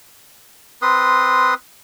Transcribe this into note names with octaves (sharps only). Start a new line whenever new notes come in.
C4 B4 C6 D#6